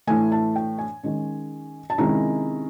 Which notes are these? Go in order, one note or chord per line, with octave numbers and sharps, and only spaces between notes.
A2 E3 A3 G#5
A5
G5
G#5
D#3 G#3 C#4
A5
C3 D#3 G#3 C#4 E4 A#5